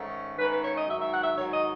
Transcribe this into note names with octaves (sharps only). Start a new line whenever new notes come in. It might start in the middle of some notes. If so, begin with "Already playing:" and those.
Already playing: G#2 D#3 A3 C#4
G#2 D#3 A3 C#4 B4
B4
C#5
D#5
G#2 D#3 F#3 E5
E5
F#5
E5
G#2 D#3 F#3 C#5
D#5